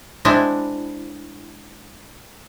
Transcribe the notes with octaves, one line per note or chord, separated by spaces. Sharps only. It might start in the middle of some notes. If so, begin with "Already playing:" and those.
G#3 C4 D4 E4